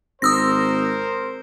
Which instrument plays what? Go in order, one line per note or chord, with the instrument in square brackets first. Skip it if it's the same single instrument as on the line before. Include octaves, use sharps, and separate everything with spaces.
[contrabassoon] G#1 [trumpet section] A#4 C5 [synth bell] D#6 E6 A#6